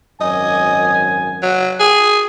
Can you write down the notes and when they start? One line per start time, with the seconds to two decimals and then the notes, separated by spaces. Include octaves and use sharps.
0.21 G#1 F#2 D#5 G#5
1.43 F#3
1.80 G#4